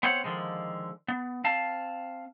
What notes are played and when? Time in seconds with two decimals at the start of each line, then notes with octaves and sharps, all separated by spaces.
0.03 B3 C4 C5 C#5 F#5
0.24 D3 D#3 F3 G#3
1.08 B3
1.44 C4 F5 A5